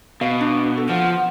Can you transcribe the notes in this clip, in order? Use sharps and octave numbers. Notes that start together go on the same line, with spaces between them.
B2 F5
D4
A4
F3 F4 F#5